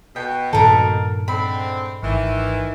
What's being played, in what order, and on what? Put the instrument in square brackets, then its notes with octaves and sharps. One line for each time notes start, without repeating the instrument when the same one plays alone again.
[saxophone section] B2 [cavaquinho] G5
[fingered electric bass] G2 A#2 D#3 [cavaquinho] A4 A#4 A#5
[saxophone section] D3 G#3 C4 [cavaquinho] B5
[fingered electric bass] G#1 [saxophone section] D#3 E3